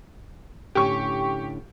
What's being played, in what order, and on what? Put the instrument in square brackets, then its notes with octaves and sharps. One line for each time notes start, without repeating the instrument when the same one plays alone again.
[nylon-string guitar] A2 D3 C#4 [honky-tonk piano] G4 C#6